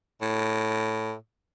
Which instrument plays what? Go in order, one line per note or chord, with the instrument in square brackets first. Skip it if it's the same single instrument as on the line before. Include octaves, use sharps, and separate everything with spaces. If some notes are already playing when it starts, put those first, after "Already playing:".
[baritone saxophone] A2